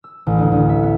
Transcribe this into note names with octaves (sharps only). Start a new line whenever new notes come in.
E6
A1
D2
D2
E5
B3